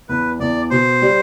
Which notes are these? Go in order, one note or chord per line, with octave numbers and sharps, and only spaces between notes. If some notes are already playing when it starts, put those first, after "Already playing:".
E2 B4
E2 D5
B2 C5
G3